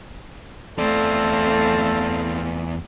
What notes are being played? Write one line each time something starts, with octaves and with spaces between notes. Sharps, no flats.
E2 E3 A3 C4 A4 D5 F5